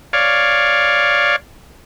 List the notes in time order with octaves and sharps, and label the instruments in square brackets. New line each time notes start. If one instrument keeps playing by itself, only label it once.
[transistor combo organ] C#5 D5 F5